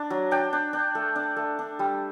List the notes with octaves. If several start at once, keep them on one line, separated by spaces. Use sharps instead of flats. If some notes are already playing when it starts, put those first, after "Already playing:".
Already playing: D4
F#3
D4 G5
D4
D4
A3
D4
A3
D4
G3